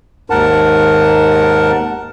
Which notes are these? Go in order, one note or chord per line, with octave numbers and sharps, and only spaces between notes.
D#2 G#2 A#4 F#5 A5